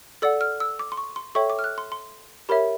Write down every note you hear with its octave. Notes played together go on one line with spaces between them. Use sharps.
A4 D5 F#5 E6
F6
E6
D6
C6
C#6
C6
A4 C#5 E5 G5 C#6
D6
F6
F#6
C6
C6
G4 A#4 C#5 E5 B5